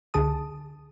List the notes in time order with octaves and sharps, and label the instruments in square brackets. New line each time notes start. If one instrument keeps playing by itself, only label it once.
[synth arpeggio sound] C#2 D3 G#4 A5 D#6